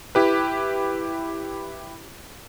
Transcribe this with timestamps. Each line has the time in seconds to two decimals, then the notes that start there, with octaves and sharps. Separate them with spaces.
0.15 E4 G4 B4